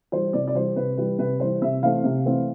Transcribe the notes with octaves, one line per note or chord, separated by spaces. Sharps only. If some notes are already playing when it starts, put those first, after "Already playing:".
E3 G3 C5
C3 D5
D5
E3 G3 C5
C3 B4
E3 G3 B4
C3 B4
E3 G3 C5
C3 E5
E3 A3 C4 F5
C3
E3 A3 C4